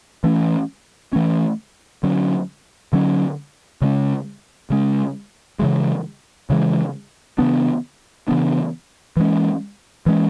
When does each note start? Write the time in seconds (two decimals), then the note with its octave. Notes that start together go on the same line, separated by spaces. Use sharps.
0.24 E3 A3 C#4
1.13 E3 A3 C#4
2.03 D3 F#3 C#4
2.93 D3 F#3 C#4
3.82 C#3 G#3 C#4
4.70 C#3 G#3 C#4
5.59 C#3 E3 G#3
6.50 C#3 E3 G#3
7.38 C#3 E3 B3 D4
8.28 C#3 E3 B3 D4
9.17 E3 G#3 C#4
10.06 E3 G#3 C#4